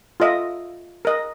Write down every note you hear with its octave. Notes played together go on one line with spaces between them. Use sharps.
F4 A4 D#5 E5
A#4 D#5